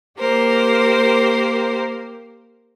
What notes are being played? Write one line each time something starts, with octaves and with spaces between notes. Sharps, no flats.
A#3 G4 A#4 C5